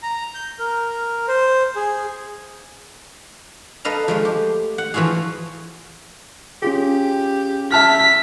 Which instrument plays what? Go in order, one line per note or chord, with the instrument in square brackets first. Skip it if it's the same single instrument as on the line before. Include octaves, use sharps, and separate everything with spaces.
[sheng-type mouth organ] A#5
G6
A#4
C5
G#4
[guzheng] A4 B4 D#5 F5 A#5
F3 G#3 A3
G4
F#5
E3 F3 F4 F#4 G#4
[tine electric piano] C#4 F4 G#4 [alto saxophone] G4
[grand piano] E5 A5 F6 [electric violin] B6